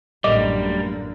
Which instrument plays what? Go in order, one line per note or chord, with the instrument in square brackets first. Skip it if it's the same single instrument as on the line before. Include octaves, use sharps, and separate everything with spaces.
[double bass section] A1 F#2 A3 [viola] D3 A#3 [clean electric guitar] G3 [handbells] D#5 D6